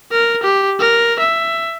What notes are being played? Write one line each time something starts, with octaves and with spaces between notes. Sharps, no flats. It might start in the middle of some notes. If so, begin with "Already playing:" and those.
A#4
G4
A#4
E5